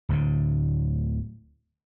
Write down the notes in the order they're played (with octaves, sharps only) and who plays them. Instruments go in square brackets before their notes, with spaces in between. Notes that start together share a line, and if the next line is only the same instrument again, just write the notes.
[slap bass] D1 D2 A2 D3